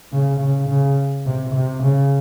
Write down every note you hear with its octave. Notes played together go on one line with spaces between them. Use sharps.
C#3
C#3
C#3
C3
C3
C#3